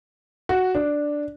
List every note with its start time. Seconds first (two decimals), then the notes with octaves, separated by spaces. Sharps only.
0.49 F#4
0.75 D4